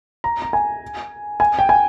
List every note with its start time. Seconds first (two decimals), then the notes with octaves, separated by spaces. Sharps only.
0.24 A#5
0.42 A#5
0.53 G#5
1.40 G#5
1.59 G5
1.69 G#5